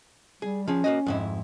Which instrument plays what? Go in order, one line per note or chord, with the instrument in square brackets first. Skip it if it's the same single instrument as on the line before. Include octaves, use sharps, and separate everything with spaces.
[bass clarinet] G3 [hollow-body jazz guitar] G#4
[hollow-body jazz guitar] F3 G#4 [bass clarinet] C#4
[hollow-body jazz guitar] A#3 F#4 D#5
F2 G#2 E4